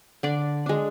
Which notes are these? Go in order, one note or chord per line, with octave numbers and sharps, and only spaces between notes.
D3 D4 D5
G#3 D4